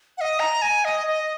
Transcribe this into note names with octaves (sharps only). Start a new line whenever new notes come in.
F#5
D#5
A#5
G#5
D#5
D#5